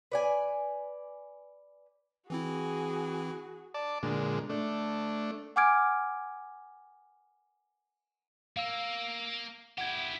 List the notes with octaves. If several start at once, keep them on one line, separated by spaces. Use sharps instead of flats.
B4 D5 G#5
E3 C4 E4 F#4 G#4
D5 A5
A#2 D3 G#3
A3 D4
F#5 G#5 D6 F6 G#6 D7
A#3 F5 E6
E4 G4 F#5 G#6